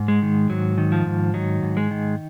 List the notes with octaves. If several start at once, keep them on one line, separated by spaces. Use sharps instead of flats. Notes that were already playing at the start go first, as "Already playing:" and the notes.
Already playing: G#2
G#3
D#3
G#2 F#3
D#3
F3
G#2
D#3 F#3
G#2
G#3
D#3